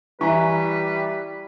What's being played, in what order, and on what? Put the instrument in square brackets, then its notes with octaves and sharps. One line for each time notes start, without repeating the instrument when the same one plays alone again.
[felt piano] E3 [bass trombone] G3 [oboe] B4 [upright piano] E5 A#5 C#6